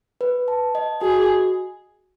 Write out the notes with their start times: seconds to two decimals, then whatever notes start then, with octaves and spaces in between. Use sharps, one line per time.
0.21 B4
0.48 A5
0.75 D#5
1.02 F#4 G#4